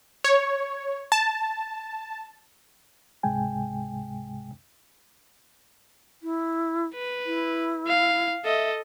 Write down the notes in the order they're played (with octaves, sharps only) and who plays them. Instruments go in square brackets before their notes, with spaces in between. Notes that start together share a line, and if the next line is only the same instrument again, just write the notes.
[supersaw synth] C#5
A5
[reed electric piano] C#2 G#2 C3 G#3 G5 G#5
[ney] E4
[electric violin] B4
[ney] E4
[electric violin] F5
[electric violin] A4 D#5 [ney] E5